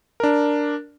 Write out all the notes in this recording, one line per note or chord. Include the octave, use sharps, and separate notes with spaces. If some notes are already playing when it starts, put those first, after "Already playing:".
D4 A#4